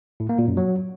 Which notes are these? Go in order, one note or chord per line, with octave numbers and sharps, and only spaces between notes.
A2
A#3
A#2
F#2
F#3